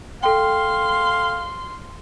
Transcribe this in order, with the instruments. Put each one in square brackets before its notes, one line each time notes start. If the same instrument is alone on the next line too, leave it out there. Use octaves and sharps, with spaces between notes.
[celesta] A4 G5 [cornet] F5 [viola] C6